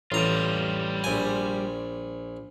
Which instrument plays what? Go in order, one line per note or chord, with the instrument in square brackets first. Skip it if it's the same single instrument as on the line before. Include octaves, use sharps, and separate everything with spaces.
[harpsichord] A1 A#5 [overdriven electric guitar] G3 F4
[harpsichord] A#1 G#5